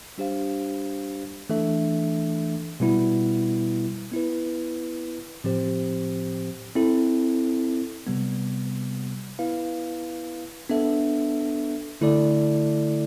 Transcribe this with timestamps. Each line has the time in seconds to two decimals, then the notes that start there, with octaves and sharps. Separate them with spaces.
0.18 G3 D4 G4 C5 F5
1.50 E3 A3 D4 A4 E5
2.80 B2 G3 B3 E4
4.12 B3 E4 B4
5.44 A2 F3 C4 G4 C5
6.75 C4 E4 A4
8.07 C3 G3 B3
9.39 B3 E4 B4 F5
10.69 B3 D4 A4 E5
12.01 D3 A3 E4 A4 D5